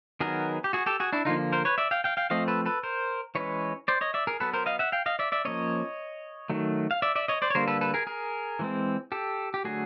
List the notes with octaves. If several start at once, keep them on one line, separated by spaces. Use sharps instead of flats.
D#3 F#3 B3 G#4 A#4
G4
F#4 G#4
G4 A4
F#4 G#4
D4 E4
D3 F3 A#3 D#4 F4
A#4 C5
B4 C#5
D5 E5
F5 G5
F5 G5
F5 G5
F3 A3 C4 D#5 F5
A4 B4
A4 B4
A#4 C5
E3 G#3 C#4 B4 C#5
C5 D5
C#5 D#5
D5 E5
G#4 A#4
F#3 B3 A4 B4
A#4 C5
D#5 F5
E5 F#5
F5 G5
D#5 F5
D5 E5
D5 E5
F3 A#3 C#4 C#5 D#5
D#3 F#3 A3
F5
D5 E5
D5 E5
C#5 D#5
C5 D5
C#5
D3 G3 A#3 A#4 C5
A4 B4
A4 B4
G#4 A#4
G#4 A#4
E3 G#3 C4
G4 A4
G4
D3 F#3 A3 F#4 G#4